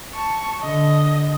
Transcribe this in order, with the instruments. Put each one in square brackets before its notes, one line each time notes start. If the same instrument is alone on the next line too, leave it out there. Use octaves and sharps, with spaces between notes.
[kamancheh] A5 C#6
[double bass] D3 [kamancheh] D#5